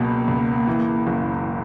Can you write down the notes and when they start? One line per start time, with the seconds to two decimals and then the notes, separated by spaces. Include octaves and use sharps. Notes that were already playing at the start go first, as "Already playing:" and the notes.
Already playing: C#2 B2 F#3 A#3
0.28 C#2
0.67 E3
1.07 F#1